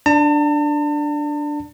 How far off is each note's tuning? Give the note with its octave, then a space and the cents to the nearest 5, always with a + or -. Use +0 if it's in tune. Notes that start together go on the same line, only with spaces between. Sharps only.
D4 +0 A5 +40